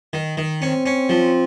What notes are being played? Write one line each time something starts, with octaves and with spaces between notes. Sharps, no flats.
D#3
D#3
C4 C#4
C#4
F3